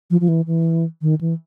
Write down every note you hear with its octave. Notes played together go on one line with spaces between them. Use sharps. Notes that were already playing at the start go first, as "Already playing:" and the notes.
F3
F3
E3
E3
D#3
E3